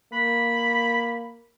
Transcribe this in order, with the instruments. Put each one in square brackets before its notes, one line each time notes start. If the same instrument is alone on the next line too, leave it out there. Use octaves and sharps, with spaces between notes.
[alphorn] A#3 [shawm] B5